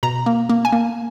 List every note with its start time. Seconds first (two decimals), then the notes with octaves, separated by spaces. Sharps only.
0.03 B2 A#5
0.26 A#3
0.49 A#3
0.65 G#5
0.72 A#3